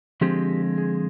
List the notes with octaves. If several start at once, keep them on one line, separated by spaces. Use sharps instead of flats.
D3 F3 G#3 C4 G4
G#4